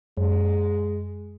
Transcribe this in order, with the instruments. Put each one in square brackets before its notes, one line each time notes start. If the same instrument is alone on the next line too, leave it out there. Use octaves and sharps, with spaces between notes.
[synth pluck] F#2 [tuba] G#3